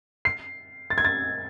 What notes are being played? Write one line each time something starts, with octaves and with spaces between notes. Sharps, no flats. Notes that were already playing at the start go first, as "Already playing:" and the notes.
C7
A6
G#6
A6